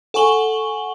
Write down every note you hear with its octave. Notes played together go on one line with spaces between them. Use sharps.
A4 F#5 G#5 C#6 F#7 G7